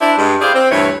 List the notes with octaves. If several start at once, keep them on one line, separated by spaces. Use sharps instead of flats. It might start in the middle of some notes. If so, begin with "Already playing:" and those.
D4 E4 C5
G2 G#3
E4 G4 G#4 C5 D5 F5
C4
D2 G2 E3 C#5